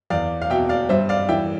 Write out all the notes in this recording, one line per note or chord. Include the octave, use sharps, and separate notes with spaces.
E2 D5 F5
F5
B2 E5 G5
D5 F5
G2 C5 E5
D5 F5
E3 E5 G5